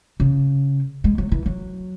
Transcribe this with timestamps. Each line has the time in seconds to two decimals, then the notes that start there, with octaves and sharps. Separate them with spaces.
0.20 C#3
1.04 G#3
1.18 F#3
1.32 E3
1.46 F#3